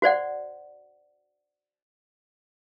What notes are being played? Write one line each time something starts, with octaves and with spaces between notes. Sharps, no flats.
F#4 C5 D5 F#5